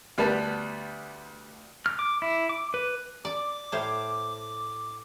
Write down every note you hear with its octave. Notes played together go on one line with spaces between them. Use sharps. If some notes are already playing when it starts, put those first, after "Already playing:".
D2 G3 B3 A5
F6
D6
E4
D6
B4
D5 D6
A2 C5 F5